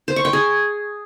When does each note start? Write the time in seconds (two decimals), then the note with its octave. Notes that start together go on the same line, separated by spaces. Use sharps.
0.08 C5
0.16 C#6
0.25 G5
0.33 G#4